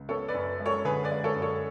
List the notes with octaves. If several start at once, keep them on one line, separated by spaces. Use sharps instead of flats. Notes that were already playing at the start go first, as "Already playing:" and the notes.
Already playing: C#2
B3 A4 C#5
B4 D5
F#2
G#3
A4 C#5
D3 G#4 B4
B4 D5
G#3
A4 C#5
F#2
A4 C#5